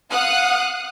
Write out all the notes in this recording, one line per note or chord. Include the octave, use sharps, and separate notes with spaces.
F5 F#5 D#6 F#6